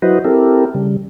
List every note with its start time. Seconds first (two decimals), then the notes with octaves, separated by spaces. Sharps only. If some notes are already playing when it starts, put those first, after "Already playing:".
0.02 F#3 E4 F#4 B4 C5 D#5
0.24 C4 E4 G4 A4 A#4
0.75 C#3 G3